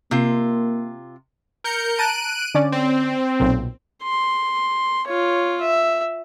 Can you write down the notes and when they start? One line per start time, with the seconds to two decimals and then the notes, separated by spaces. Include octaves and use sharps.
0.11 C3 A#3 F4
1.64 A#4 G6 C#7
1.99 A5 A#5 F#6 D7 D#7
2.54 D3 C#4 D5
2.72 C4
3.40 B1 A#2
4.03 C6
5.07 F4 C#5
5.61 E5